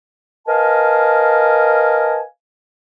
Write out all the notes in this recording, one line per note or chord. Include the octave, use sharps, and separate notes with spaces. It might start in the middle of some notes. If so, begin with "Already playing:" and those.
A#4 B4 D#5 F5 G#5 A5